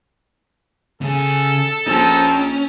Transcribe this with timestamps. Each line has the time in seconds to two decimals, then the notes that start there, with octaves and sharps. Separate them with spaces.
1.01 C#3 G#4 A4
1.87 A#1 C4 C#4 D#4 A5